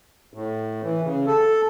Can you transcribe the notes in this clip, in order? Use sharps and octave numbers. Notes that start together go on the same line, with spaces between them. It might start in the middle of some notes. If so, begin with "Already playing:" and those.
A2
E3
C#3
A4